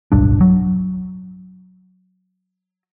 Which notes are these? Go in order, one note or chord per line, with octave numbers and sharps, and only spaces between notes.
D1 B1 G2 D4
F#3